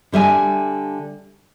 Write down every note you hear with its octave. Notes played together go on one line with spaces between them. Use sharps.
D3 G3 E5 G#5